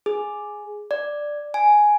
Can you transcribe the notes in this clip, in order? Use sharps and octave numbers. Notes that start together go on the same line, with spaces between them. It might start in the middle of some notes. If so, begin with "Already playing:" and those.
G#4
D5
G#5